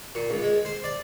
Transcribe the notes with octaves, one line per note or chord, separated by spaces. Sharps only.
A#2
C#2
G#3
C5
D5